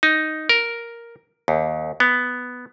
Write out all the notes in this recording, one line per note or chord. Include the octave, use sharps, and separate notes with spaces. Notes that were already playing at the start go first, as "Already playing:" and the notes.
D#4
A#4
D#2
B3